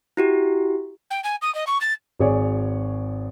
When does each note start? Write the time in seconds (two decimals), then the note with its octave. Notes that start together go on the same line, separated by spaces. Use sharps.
0.17 E4 F#4 G4
1.10 G5
1.23 G#5
1.41 D#6
1.54 D#5
1.66 C#6
1.80 A6
2.19 G#1 G#4 C#5 D5